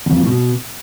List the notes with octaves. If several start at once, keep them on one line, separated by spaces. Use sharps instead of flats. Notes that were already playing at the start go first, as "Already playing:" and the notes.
E2
F2
A#2
A2
B2